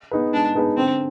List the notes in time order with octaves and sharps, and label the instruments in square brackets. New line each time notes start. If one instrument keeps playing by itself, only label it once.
[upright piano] B3 D#4 G#4 B4
[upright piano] G#3 [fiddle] D4
[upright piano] B3 D#4 G#4 B4
[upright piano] D3 [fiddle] C4